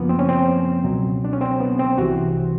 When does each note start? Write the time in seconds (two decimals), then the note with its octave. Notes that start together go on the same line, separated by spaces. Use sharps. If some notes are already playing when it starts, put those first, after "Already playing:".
Already playing: F#2 C#3 F3 A#3 B3
0.09 C4
0.19 C#4
0.29 C4
0.84 C#2 B2 F#3
1.25 D4
1.33 C#4
1.41 C4
1.60 B3
1.79 C4
1.98 C2 C3 E3 F#4